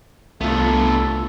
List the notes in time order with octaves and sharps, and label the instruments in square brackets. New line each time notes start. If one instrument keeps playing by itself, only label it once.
[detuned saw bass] C2 [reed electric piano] A3 F4 [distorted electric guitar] B3 D4 [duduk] A4